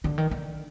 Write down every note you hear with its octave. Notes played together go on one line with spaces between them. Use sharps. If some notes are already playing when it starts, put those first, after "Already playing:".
D3
D#3
D3